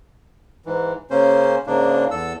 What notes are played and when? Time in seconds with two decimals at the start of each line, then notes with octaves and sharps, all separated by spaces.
0.65 G#2 E3
1.10 C#3 A#3 C#4 C5
1.67 G#2 C#3 A#3 D4
2.11 E2 A4 E6